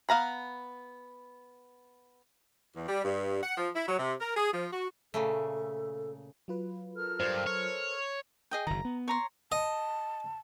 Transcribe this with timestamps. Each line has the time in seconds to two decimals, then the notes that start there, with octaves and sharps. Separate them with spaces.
0.09 B3 F5 A#5 B5
2.76 E2
2.89 G3
3.04 G2
3.43 F#5
3.57 F3
3.76 E4
3.87 F#3
3.99 C3
4.21 A#4
4.37 G#4
4.53 F3
4.72 F#4
5.14 A#2 C#3 A3 A4
6.48 F#3 F4 B4
6.94 A4 A#4 F6
7.20 G2 C5
7.46 C#5
8.51 G#4 D#5 G5
8.67 F#1 D#3 A#5
8.85 B3
9.08 C#5 A#5 C6
9.52 D#5 A5